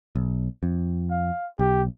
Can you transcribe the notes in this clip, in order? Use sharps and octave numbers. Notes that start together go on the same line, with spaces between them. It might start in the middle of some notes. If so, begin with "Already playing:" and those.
B1
F2
F5
B1 G4